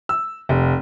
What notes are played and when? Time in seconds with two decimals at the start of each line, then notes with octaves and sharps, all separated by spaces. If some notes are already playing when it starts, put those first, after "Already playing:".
0.09 E6
0.49 F1